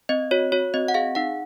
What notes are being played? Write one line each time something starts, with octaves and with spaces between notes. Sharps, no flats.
C4 D#5
F#4 C#5
F#4 C#5
C4 D#5
F#5
G#4 F5
D#4 F#5